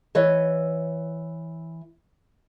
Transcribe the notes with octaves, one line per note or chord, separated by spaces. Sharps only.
E3 B4 C#5 D#5